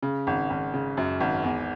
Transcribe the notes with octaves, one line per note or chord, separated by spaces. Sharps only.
C#3
G#1
G#1
C#3
F#2
G#1
E2